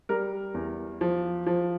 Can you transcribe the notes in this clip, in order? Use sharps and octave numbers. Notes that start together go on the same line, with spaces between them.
G3 A#4
E2
F3
F3